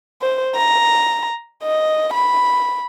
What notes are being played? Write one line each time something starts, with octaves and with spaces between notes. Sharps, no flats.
C5
A#5
D#5
B5